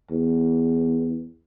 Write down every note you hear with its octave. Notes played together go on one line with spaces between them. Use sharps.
E2